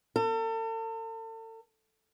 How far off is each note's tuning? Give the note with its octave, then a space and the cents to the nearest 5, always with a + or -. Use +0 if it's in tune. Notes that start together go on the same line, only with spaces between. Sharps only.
A4 +40